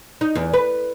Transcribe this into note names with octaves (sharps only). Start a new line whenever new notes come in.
D#4
E2
B4